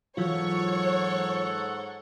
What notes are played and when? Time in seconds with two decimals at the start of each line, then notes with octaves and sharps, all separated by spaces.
0.17 G#2 E3 F#3 F4 A4 C#5 F#5 C#6